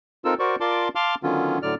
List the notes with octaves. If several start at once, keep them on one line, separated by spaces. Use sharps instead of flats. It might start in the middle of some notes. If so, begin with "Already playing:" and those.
C4 D#4 F4 A4 A#4 E6
F#4 A#4 C5 D5 C#6
F4 A#4 D5 A5 C6 D6
F5 A5 C6 D6 F6
D3 D#3 F#3 B3 C#4 F4
A2 D3 F#3 D5 F6